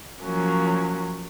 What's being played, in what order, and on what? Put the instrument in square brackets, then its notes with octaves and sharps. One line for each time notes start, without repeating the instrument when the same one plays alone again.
[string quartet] F3 F#3 A#3 C#4